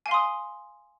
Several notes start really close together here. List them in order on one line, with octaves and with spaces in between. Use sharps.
G#5 F5 C6 D#6